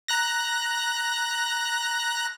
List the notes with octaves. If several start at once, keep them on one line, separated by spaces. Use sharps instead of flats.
A#5 F#6 A#6